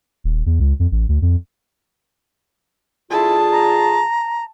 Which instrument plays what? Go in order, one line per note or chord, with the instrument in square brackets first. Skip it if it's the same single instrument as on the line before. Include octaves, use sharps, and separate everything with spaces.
[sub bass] D#1
E2
C#2
F2
A1
D2
F2
[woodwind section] D3 F4 G#4 [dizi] E4 [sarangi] A5
[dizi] A#5